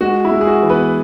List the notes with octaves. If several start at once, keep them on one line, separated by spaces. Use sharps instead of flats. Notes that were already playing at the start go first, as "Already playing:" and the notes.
G#3 F#4
E4
G#3
G#4
F#4
E3
B3 B4